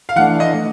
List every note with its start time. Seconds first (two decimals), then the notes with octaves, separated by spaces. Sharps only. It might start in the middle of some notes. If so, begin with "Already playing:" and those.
0.09 F5
0.16 E3 A3 D4 F#5
0.40 D#5